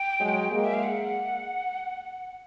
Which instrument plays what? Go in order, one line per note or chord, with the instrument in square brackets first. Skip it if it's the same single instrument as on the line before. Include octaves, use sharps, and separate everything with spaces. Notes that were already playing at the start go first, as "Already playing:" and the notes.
Already playing: [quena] G5
[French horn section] F#3 G#3
G#3 A#3
[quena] E5
F5
F#5